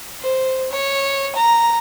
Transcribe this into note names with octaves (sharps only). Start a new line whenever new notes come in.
C5
C#5
A#5